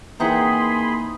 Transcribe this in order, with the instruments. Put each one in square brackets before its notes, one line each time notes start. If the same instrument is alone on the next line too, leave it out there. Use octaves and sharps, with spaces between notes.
[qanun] E3 C4 F#5 [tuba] A#3 [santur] D#4 [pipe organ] G#4 B5 C6